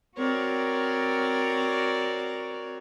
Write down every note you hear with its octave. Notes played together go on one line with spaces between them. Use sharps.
C4 F#4 A#4 C#5 D5